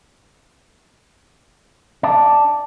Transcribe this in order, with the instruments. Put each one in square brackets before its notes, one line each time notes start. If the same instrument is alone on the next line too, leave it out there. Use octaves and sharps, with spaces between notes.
[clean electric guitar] D4